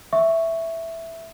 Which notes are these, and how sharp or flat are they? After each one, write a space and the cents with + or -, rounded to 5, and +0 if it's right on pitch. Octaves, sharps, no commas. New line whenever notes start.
E5 +0 C#6 +0